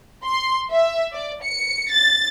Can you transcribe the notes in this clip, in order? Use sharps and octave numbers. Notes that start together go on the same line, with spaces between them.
C6
E5
D5
C#7
A6